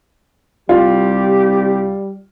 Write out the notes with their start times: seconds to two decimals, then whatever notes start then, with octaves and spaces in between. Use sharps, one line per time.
0.69 C2 G3 F4 G4